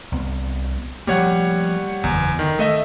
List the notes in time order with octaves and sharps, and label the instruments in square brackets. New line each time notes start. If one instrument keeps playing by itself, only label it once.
[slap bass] C2 B3
[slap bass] F3 A3 A#3 [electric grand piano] G3 C#5 F#5
[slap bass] F#1 [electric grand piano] E2
[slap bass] D3 [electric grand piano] D#3
[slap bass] D#3 [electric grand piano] A3 D#5 E5